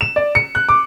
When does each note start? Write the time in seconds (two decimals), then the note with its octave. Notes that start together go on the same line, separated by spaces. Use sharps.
0.01 E7
0.16 D5
0.35 C#7
0.55 F#6
0.69 D6